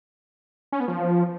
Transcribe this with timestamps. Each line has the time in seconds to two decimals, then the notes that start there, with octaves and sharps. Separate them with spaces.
0.72 C#4
0.80 B3
0.88 F3